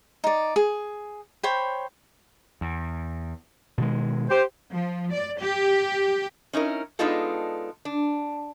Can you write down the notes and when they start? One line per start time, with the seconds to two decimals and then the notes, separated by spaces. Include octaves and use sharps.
0.24 D#4 D5
0.56 G#4
1.43 C5 C#5 G5 B5
2.61 E2
3.78 B2 D#3 G#3
4.30 G4 C5
4.73 F3
5.11 D5
5.41 G4
6.53 C#4 D#4 E4 A#4
6.99 G#3 B3 D4 D#4 F4 A4
7.85 D4